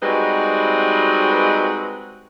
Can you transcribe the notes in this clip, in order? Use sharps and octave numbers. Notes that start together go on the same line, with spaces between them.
G3 G#3 C4 D#4 F#4 B4